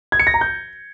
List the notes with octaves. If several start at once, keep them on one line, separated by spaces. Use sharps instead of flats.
G#6
C#7
A#6
A#5
G6